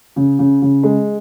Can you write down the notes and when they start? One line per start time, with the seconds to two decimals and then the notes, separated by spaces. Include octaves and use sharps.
0.16 C#3
0.39 C#3
0.62 C#3
0.83 G#3